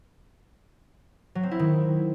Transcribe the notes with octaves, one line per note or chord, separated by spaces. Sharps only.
F#3
C4
E4
D#3